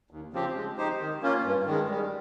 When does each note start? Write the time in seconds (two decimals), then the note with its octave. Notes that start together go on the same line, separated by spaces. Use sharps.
0.11 D#2
0.33 C#3 F3 C4 G4
0.55 G#3
0.78 D#4 G4 C5
1.00 D#3
1.22 A#3 C#4 F4
1.44 G2
1.67 D#3 G#3
1.90 G3